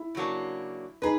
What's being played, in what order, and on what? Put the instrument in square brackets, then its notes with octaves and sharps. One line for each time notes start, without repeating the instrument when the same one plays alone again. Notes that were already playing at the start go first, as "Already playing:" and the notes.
Already playing: [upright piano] E4
[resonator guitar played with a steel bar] C#3 F#3 A#3 D4
[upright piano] D#4 [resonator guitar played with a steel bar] G#4 B4